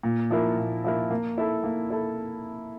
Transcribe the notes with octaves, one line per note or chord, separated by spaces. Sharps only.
A#2
F3 A#3 E4 A#4
A#2
F3 A#3 E4 A#4
A#3
E4 A4
A#3
E4 A4